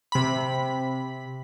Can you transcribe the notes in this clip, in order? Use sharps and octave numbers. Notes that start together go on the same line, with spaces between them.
C3 B5